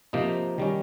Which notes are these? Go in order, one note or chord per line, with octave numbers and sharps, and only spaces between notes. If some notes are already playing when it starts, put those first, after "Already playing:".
C3 F3 A#3 D#4
D#3 G3 C#4